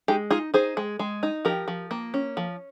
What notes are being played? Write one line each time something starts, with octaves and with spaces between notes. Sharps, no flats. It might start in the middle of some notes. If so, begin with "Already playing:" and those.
G#3 D#4 G4
D#4 F4 G#4
D#4 G#4 C5
G#3
G#3
D#4
F3 G4 A#4
F3
A#3
C#4
F3